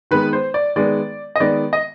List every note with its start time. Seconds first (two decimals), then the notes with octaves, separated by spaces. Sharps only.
0.11 D#3 G#3 B3 B4
0.33 C5
0.54 D5
0.76 D#3 G#3 B3 D5
1.36 D#5
1.40 D#3 G#3 B3 D5
1.73 D#5